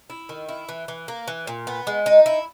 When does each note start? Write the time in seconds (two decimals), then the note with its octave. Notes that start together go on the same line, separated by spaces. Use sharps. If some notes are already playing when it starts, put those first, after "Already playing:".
0.10 E4
0.29 D#3
0.49 E4
0.69 E3
0.88 E3
1.08 A#3
1.28 E3
1.47 A#2
1.67 B3
1.87 G#3
2.06 D#4
2.26 E4